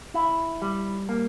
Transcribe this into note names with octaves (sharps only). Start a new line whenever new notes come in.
E4
G3
A#3